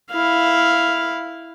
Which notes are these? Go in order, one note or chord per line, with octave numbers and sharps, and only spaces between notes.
E4 F5